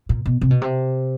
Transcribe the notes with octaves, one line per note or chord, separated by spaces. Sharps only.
A#2
B2
C3
B2
C3